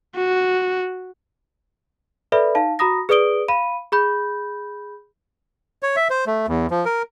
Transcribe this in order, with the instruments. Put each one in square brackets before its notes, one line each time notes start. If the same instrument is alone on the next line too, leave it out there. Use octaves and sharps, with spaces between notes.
[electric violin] F#4
[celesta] A4 B4 D5 E5 B5
D#4 F5 A5
F#4 A#5 B5 D#6 A#6
G#4 B4 D5 D#6 D7 G7
F5 B5 D#7
G#4 B5 G6
[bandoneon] C#5
E5
C5
A3
E2
F3
A#4